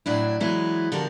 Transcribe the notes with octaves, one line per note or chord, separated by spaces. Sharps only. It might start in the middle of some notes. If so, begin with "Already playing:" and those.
A2 F#3 D4 E4
E3 F#3 G#3 B3 E4
D3 F3 F#4 G4 A#4